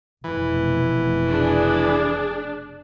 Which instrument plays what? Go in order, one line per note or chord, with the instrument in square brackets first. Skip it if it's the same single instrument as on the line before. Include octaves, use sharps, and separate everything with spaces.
[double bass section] F1 B2 [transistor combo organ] E3
[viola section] D4 [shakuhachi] G#4